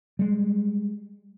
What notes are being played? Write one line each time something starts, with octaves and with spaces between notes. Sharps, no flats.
G3 G#3